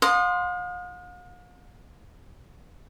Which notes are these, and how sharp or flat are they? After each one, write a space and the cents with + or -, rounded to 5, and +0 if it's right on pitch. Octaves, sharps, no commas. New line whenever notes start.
F5 +45 C6 +0 D#6 -20